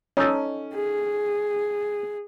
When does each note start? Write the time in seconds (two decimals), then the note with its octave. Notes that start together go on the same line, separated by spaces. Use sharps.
0.17 C#4 D#4 A4
0.74 G#4